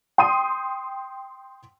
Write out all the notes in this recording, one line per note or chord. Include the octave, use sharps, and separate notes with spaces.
G5 C6 D#6 D#7